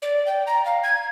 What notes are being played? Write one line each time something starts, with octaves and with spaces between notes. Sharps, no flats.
D5
G5
A#5
F5
G#6